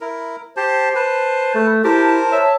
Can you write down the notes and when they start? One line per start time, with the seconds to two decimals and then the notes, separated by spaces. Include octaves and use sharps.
0.01 E4 A#4
0.57 G4 C5 A5
0.95 B4 A5
1.55 A3 A4
1.84 E4 G4 A#4 C5 A5
2.32 C#5 E5